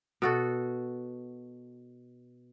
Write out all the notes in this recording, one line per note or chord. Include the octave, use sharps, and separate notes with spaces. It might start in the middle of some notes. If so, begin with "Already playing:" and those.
B2 F#4 A4